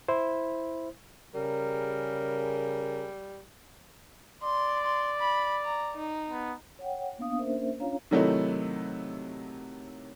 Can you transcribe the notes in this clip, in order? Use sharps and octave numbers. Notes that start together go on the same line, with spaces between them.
E4 C5
C#3 G3 G#4 A#4
D5 C6
C6
B5
A#5
D#4
B3
C#5 F#5 G5
A#3 B3 D4 F5 D#6
A#3 C#4 D4 A#4 C5 E5
C#4 D4 F4 C#5 F5 A#5
C3 D#3 F#3 A3 D#4 E4